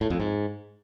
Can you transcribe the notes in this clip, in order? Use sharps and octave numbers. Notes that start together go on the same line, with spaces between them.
A2
F2
G#2